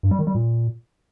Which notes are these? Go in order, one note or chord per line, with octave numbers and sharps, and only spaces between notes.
G2
G3
D#3
G3
A#2